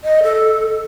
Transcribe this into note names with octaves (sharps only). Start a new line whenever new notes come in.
D#5
A4